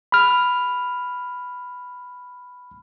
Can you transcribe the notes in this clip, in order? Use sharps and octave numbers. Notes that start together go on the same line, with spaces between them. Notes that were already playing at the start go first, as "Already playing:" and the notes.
B5 F6